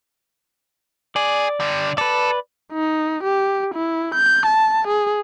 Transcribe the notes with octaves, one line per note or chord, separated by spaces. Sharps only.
G#4 D5
D3 G3
A4 B4 D5
D#4
G4
E4
G6
A5
G#4